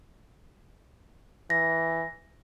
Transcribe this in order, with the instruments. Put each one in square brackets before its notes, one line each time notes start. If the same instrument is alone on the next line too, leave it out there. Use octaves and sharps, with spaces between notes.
[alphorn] E3 [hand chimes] A#6